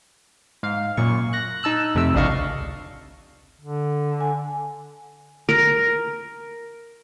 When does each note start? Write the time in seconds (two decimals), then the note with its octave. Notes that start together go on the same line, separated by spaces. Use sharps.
0.63 G#2 F5
0.97 F#2 A#2 C#6
1.33 F#6 A#6
1.63 D#4 A5 E6 F#6
1.95 F2 C3 A3 E6
2.14 G#1 C#2 D4 D#5 F5 C#6
3.61 D3
4.21 G#5
5.49 A#4